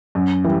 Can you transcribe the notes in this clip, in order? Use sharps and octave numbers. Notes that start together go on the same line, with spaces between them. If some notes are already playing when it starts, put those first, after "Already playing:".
F#2
E3 G3